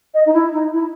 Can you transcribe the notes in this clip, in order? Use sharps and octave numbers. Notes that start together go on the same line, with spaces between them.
D#5
D#4
E4
D#4
E4